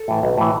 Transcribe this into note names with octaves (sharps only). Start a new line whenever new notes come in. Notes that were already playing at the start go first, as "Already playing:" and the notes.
Already playing: A4
A2 E3
B1
A2 E3